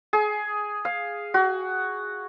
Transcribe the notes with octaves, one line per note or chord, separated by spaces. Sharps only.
G#4
F5
F#4